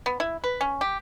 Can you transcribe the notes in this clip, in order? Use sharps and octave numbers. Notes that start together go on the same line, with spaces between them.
B3
E4
B4
C#4
G4